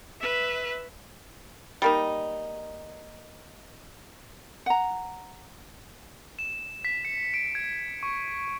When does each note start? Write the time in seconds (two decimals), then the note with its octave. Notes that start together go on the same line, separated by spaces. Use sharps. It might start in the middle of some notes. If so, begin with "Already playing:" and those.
0.20 B4 E5
1.82 G3 A#3 D#4
4.66 F#5 A#5
6.39 E7
6.85 B6
7.05 C#7
7.34 D7
7.55 G#6
8.03 C#6